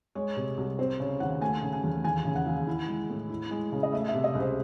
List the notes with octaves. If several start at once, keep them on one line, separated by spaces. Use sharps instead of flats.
G#3 C#5
C3
C2
C4 C5
C#3 C#5
D#2 F#5
A3 G#5
C#3
G#5
E2
D#2 G#5
C#3
F#5
D#2
E4
G#3
A2
E4
G#3
C#3
D#5
A3 E5
C3 E5
D#5
C#2
C5